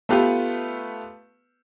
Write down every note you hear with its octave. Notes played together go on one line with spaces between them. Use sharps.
A3 B3 F4 G4 B4